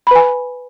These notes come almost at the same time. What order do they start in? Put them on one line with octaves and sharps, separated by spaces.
B5 B4 G#5